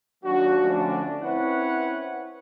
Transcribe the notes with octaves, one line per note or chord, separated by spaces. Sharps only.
D#2 F#3 D4 F#4
D3 F3 A3 C#4 D4
C4 C#4 E4 B4 C#5 F#5